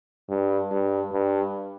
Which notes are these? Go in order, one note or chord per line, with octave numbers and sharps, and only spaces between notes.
G2
G2
G2